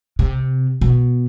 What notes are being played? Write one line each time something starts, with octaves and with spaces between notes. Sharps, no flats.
C3
B2